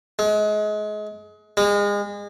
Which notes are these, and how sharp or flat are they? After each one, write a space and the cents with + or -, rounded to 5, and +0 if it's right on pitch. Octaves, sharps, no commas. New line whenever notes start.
G#3 +30
G#3 -30